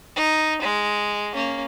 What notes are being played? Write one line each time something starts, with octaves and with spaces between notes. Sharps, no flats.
D#4
G#3
A#3 C#4